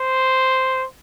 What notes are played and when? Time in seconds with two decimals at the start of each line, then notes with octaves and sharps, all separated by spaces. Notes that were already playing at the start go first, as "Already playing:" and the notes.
Already playing: C5